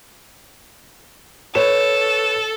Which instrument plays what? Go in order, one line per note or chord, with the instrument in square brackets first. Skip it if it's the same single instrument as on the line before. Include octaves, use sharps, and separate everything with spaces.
[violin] A4 [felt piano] B4 C#5 E7